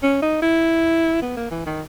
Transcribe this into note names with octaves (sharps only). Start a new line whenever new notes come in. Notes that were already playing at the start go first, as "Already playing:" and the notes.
C#4
D#4
E4
B3
A#3
E3
D#3